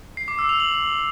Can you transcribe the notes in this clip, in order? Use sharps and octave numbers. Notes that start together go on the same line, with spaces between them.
C7
D6
E6
F7
F#7